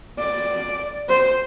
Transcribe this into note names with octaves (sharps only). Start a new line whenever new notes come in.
D5
C5